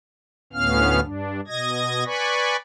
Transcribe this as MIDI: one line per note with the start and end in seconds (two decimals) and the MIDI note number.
0.53 1.00 38
0.53 1.00 45
0.53 1.00 59
0.53 1.00 61
0.53 1.00 77
0.53 1.00 89
1.01 1.40 43
1.01 1.40 62
1.48 2.04 47
1.48 2.04 75
1.48 2.04 92
1.48 2.04 94
2.05 2.56 71
2.05 2.56 74
2.05 2.56 80
2.05 2.56 83
2.05 2.56 85